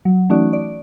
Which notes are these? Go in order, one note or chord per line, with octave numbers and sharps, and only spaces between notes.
F#3
E3 A3 C#4 D#4 F#4 D5
D5